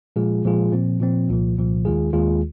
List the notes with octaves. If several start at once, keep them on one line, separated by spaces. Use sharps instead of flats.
A#2 F3 G#3 F4 G#4
A#2 F3 G#3 F4 G#4
A#2 F3 C4
A#2 F3 C4
C2 A#2 F3
C2 A#2 F3
D#2 D#3 G#3 F4 G#4
D#2 D#3 G#3 F4 G#4